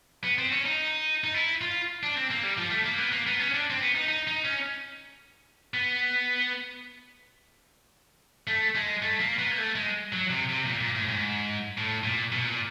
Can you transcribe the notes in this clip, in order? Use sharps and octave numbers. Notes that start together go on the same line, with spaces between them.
B3
C4
C#4
D#4
D#4
E4
F4
D4
C4
A#3
G3
F3
A3
A#3
B3
A#3
B3
C#4
D4
C4
B3
D#4
D#4
D#4
C#4
B3
A3
G#3
A3
A#3
B3
A#3
A3
G#3
F#3
C3
C3
A#2
A#2
A2
G#2
A2
A#2
B2
A#2